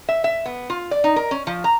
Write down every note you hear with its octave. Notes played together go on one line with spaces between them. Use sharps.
E5
E5
B3
F4
D5
D#4
A#4
C#4
F3
A#5